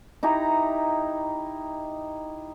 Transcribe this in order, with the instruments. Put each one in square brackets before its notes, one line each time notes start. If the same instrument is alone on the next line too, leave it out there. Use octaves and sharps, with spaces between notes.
[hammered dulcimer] D#4 E4 G4 A#5